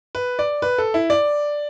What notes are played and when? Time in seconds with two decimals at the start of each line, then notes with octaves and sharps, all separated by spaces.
0.15 B4
0.39 D5
0.62 B4
0.78 A4
0.94 E4
1.10 D5